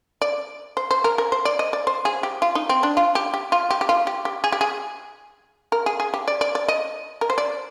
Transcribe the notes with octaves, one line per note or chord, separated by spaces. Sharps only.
D5
C5
C5
A#4
A#4
C5
D5
D#5
D5
C5
G#4
G4
F4
D#4
C4
D4
F4
G4
G4
F4
G4
G4
F4
G4
G4
G#4
G4
G#4
A#4
G#4
G#4
G4
D5
D5
D5
D#5
A#4
C5
D5